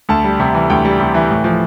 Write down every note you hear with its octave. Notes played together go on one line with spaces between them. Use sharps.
D2 A5
G3
C3
E3
D2 G5
G3
C3
E3
A2
F3